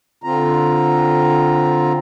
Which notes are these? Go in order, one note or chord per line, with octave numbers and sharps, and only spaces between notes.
D3 C4 F4 A#5